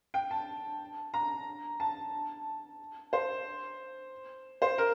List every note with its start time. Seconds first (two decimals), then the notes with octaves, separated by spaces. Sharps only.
0.14 G5
0.31 A5
1.14 A#5
1.80 A5
3.13 C5
4.62 C5
4.78 A#4